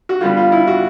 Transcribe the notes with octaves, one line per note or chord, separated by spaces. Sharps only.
F#4
D3 G3 B3 F4
F4
E4
F#4